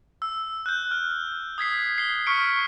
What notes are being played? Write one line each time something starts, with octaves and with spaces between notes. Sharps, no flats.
E6
F#6 G6
F6
D#6 G#6 B6 C7
C7 G7
C#6 F6 B6 C#7 D7